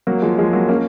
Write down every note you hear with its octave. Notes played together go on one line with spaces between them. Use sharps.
F#3 A#3
F3 G#3
F3 G#3
F#3 A#3
A#3 C#4